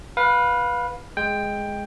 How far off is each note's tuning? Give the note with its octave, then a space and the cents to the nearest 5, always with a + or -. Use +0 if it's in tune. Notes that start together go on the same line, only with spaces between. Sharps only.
B4 -10 F5 +25
G#3 +0 G5 +10